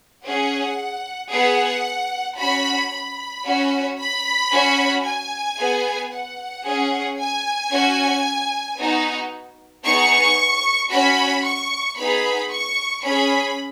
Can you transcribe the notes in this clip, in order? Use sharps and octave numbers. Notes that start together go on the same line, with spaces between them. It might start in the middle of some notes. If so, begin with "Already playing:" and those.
C#4 G#4 F#5
B3 G#4 F#5
C#4 F#4 B5
B5
C#4 F#4
B5
C#4 F#4
G#5
B3 G#4
F#5
C#4 G#4
G#5
C#4 F#4
B3 D#4 F#4
B3 D#4 G#4 C#6
C#4 F#4 B5
C#6
B3 D#4 G#4 B5
C#6
C#4 G#4 B5